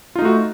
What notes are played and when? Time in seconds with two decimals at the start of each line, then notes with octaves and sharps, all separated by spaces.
0.15 F4
0.19 D#4
0.22 A3
0.25 F#4